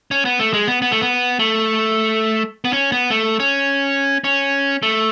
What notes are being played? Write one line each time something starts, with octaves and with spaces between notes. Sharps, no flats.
C#4
B3
A3
G#3
B3
B3
A3
B3
A3
B3
C#4
B3
A3
C#4
C#4
A3